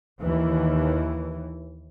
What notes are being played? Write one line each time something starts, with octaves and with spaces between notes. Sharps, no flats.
D#2 E3